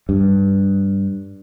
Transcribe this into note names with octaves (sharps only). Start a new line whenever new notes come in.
G2